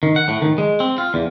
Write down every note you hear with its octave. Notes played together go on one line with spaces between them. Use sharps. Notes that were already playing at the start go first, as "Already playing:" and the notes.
D#3
F#5
A2
D#3
G#3
C4
F4
E2